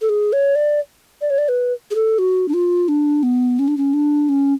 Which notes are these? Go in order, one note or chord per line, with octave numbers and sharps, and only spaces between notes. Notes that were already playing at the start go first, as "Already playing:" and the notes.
A4
G#4
C#5
D5
D5
C#5
D5
B4
G#4
A4
F#4
D4
F4
D4
B3
C#4
D4
C#4
D4
C#4